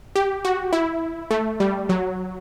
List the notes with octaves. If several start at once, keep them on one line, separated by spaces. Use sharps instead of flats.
G4
F#4
E4
A3
G3
F#3